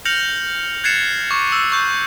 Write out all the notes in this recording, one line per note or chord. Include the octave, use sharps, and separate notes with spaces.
F6 G6 A#6 C#7 F7 F#7
F#6 G#6 A6 C7 C#7 E7
C#6 D6
E6
C#6 G6